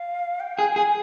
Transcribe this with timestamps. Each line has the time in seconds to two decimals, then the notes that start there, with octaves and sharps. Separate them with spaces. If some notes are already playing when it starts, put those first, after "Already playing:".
Already playing: F5
0.40 G5
0.59 G#4
0.76 G#4 G#5